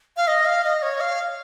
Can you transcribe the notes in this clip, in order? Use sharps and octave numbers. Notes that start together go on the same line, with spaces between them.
F5
D#5
F5
D#5
C#5
F5